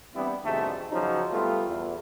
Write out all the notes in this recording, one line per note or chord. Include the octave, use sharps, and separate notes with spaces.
E3 G3 B3 C4 D4 E4
F2 G#2 B2 D3 G3 A3
C#3 F3 F#3 D#4
G3 A3 B3 F4
E2